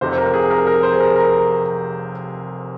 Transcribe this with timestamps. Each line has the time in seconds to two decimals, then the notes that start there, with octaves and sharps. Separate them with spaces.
0.01 F1 F2 C3 C5
0.18 A#4
0.34 G#4
0.51 A#4
0.67 A#4
0.83 C5
0.94 G#4
1.00 A#4
1.16 A#4